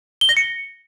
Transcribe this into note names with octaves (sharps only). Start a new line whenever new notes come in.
G7
A#6
C#7